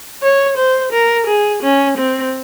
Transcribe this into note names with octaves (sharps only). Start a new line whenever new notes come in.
C#5
C5
A#4
G#4
C#4
C4